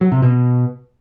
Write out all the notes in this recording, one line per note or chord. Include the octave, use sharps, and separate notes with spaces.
F#3
C3
B2